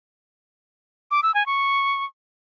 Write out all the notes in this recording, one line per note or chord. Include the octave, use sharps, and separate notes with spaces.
D6
E6
G#5
C#6